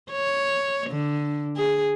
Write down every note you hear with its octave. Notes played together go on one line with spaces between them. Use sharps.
C#5
D3
G#4